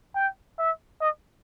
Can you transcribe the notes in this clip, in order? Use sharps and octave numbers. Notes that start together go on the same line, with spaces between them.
G5
E5
D#5